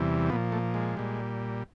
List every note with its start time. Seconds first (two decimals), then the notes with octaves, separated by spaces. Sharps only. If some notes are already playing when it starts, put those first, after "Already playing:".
Already playing: E2 C3 E3 G3
0.30 A#2 F3 B3
0.52 A3
0.74 G#3
0.97 A#2 G3